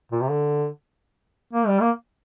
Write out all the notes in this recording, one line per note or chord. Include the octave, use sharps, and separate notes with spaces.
A#2
C3
D3
A#3
G3
A#3